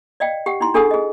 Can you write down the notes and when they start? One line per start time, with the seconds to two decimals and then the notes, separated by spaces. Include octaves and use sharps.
0.20 D5 D#5 F5 G5
0.46 G4 F#5 G5
0.61 D#4 E4 C6
0.74 D4 G#4 A4 F#5 G#5 D#6
0.91 G#4 D#5